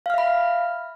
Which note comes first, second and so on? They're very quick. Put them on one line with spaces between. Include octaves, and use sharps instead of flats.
F5 F6 E5 B5